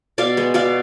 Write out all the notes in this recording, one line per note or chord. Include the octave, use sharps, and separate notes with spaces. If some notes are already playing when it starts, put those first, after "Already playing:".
B2 D5 F5
G#3 B3
B2 D5 F5